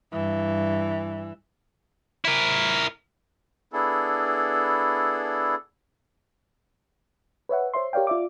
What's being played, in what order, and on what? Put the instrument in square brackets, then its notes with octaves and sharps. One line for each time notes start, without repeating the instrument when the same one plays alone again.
[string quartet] G2 [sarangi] E3
[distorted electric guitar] E4 A#4
[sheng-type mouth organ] B3 D4 E4 G#4 A4
[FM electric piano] B4 C#5 E5 F#5
C5 C#5 E5 C6
G4 A#4 C#5 D5 F5 G5
F4 D5 E5 D6